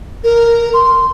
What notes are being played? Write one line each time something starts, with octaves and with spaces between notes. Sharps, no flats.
A#4
C6